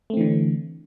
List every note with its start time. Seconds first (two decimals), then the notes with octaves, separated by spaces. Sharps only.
0.10 A3
0.13 C4
0.17 E3
0.21 D3